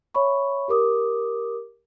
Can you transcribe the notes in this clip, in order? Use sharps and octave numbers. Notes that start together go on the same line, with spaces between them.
C#5 E5 B5 C#6
G4 A#4 D6 D#6